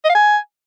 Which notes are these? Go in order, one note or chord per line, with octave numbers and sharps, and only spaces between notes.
D#5
F5
G#5